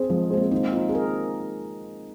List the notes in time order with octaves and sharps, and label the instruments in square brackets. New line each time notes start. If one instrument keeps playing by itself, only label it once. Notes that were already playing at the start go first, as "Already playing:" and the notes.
Already playing: [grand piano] C4 G#4 C5
[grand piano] F3 [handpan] G#3
[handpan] G#3 [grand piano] C4 G#4 C5
[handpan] A#3
[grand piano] D#3 [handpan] C4
[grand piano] C4 D#4 [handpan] F4
[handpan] G#4
A#4